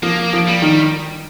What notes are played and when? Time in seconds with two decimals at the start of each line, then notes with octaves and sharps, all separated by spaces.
0.03 F3 A#3
0.33 F3
0.47 G3
0.62 D#3